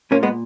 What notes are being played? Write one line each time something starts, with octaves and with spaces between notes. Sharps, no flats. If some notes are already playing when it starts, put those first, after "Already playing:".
A#2 A#3 C#4
G#3 B3